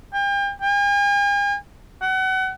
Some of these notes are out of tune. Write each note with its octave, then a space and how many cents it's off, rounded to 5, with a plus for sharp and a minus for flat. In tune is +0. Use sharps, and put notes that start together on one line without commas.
G5 +40
G#5 -45
F#5 +30